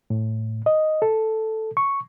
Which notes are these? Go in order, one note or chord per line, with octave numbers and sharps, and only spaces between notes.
A2
D#5
A4
C#6